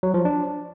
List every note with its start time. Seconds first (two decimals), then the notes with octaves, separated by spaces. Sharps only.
0.03 F#3
0.14 F3
0.25 D4